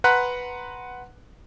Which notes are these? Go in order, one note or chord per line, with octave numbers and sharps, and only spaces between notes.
B4 F#5 A#5 C6 F#6 B6